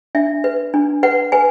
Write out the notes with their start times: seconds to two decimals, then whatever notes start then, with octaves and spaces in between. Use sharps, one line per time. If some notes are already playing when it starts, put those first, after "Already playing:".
0.15 D4 E5
0.44 B4
0.74 D4
1.03 B4 F#5
1.32 B4 G#5